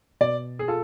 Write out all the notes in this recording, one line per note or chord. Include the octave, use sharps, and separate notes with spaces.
B2 D5
G#4
F4 A4